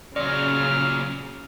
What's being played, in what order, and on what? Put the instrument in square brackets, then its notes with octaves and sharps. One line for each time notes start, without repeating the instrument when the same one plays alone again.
[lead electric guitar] A#2 F#3 [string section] C#3 [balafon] D5 [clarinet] F6